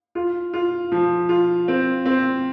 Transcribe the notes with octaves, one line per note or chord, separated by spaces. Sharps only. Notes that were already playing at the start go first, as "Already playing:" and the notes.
F4
F4
F3
F4
C4
C4